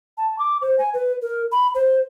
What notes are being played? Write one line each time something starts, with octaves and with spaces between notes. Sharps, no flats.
A5
D6
C5
G#5
B4
A#4
B5
C5